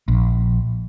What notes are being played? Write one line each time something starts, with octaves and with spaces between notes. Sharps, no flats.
A#1